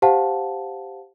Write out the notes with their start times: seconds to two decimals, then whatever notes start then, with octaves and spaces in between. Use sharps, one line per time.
0.02 G4 C5 F5 F#5 A5